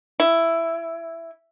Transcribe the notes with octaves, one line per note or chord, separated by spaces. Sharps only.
E4